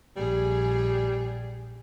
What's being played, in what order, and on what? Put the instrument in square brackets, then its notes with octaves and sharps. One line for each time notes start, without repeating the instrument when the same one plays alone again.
[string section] A#1 G#4 [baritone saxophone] G3